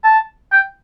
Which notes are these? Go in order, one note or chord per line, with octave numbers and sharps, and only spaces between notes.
A5
G5